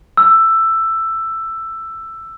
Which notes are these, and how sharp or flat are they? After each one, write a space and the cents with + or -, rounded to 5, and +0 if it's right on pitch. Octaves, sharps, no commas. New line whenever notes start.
E6 +10